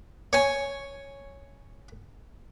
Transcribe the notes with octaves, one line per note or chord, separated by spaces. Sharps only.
C#5 G#5